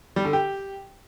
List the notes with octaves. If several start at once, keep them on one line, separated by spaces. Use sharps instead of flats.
G3
D3
G4